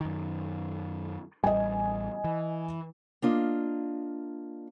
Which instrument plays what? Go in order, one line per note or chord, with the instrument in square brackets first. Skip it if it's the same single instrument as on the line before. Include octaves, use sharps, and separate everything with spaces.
[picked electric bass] F#2 D#3
[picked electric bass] A1 G3 [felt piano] D#5 G#5
[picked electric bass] E3
[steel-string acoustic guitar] A#3 D4 F4 D#5